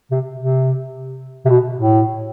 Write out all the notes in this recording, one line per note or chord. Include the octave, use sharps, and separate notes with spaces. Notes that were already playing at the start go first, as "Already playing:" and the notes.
C3
C3
C3
B2
A2